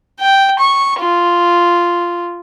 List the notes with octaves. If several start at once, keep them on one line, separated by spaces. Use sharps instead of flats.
G5
C#6
F4